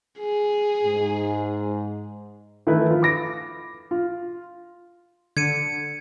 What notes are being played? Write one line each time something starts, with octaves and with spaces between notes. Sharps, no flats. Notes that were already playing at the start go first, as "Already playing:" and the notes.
G#4
G#2
D#3 E3 A3 E4 B4
F3 F4
B5 D6 A#6 D7
F4
D3 G#6 C#7 D#7